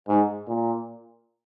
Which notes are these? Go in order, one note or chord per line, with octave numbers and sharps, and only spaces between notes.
G#2
A#2